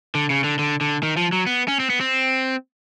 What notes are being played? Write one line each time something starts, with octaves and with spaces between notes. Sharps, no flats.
D3
C#3
D3
D3
D3
D#3
F3
F#3
B3
C#4
C4
B3
C4